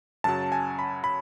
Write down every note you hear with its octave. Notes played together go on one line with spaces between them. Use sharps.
F#2 C#3 F#3 A5
G#5
B5
B5